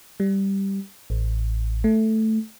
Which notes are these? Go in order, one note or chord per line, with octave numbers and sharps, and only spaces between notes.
G3
A1
A3